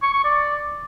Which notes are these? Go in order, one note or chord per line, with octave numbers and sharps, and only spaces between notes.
C#6
C#6
D5